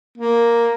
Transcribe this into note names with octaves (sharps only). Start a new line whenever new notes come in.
A#3